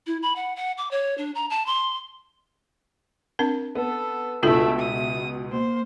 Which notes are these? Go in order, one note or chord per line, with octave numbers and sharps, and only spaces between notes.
E4
B5
F#5
F#5
D6
C#5
D4
A#5
A5
C6
C4 D4 A#4
B3 A4
C#2 B2 A3 D4 E4 F4 A4 E5
D#6
A#3 C5